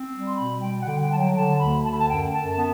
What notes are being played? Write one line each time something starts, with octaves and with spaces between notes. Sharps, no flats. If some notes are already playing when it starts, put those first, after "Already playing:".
Already playing: C4
G3
C6
B2 B5
G3 G5
F#5
D3 G5
G5
F#3 A5
G5
D3 A5
D2 B5
D3 A5
B5
A5
F#2 G5
F#2 A5
A5
B3